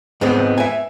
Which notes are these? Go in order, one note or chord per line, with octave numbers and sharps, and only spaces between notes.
G#2 G#3 B3 C4
E5 G#5